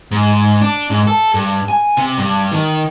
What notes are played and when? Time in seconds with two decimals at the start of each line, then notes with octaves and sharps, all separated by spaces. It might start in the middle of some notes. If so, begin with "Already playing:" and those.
0.11 G#2
0.61 D4
0.90 G#2
1.07 A4
1.34 G2
1.68 G#5
1.97 C3
2.18 G2
2.52 D#3